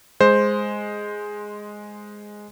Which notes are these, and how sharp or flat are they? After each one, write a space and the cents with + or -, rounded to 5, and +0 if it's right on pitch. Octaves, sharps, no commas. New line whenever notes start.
G#3 +0 C5 +0